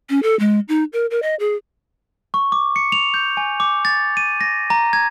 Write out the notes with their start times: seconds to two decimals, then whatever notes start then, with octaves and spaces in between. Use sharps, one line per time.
0.10 C#4
0.23 A4
0.39 G#3
0.69 D#4
0.93 A#4
1.11 A#4
1.23 D#5
1.40 G#4
2.34 C#6
2.52 D6
2.76 C#7
2.92 F7
3.14 G6
3.37 G#5
3.60 D6
3.85 A6
4.17 D#7
4.41 A#6
4.70 A#5
4.93 G#6